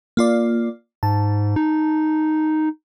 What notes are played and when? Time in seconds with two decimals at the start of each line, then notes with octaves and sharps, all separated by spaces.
0.17 A#3 F4 D5
1.03 G#2 A5
1.56 D#4